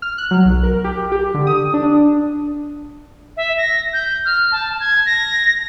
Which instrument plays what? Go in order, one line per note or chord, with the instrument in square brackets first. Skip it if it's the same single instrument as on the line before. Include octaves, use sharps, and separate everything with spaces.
[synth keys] F6
F#6
F#3
B1
A#4
G4
G4
D3
D#6
D4
[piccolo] E5
A#6
G6
F6
A5
G#6
A#6